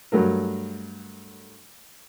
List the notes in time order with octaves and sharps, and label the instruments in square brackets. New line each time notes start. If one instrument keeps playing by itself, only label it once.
[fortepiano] G2 F#3 A3 A#4